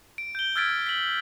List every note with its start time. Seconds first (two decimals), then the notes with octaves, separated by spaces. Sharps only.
0.18 D7
0.35 G6 G7
0.56 E6 F6 G#6 A6 B6 D7
0.86 B6 F#7